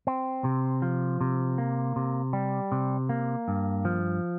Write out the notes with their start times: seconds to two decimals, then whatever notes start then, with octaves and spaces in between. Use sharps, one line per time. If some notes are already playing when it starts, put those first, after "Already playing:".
0.07 C4
0.44 C3
0.82 F3
1.21 C3
1.58 A#3
1.96 C3
2.33 G3
2.72 C3
3.09 A#3
3.48 G2
3.85 F3